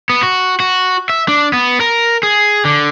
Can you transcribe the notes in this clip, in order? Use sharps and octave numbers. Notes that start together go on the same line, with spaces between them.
B3
F#4
F#4
E5
D4
B3
A#4
G#4
D3